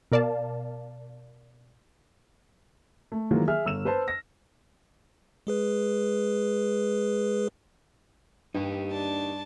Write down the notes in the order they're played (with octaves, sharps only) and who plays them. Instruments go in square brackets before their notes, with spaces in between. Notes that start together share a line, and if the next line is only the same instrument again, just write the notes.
[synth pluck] B2 A#4 D5 F5 A5
[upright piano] A3
D#3 E3 F#3 G#3 A#3 F4
G#4 E5 F6
G1 E6 E7
B4 C5 A5
A#6
[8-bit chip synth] G#3 G#4 B4
[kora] G2 [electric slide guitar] D#4 G4
[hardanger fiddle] D4 A5